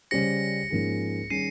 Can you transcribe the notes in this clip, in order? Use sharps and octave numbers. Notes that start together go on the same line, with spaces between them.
C#3 G3 C#4 G4 C5 A#6 C#7
G#2 F3 A#3 C#4 G#4
D#3 G3 C#4 G#4 C7 D#7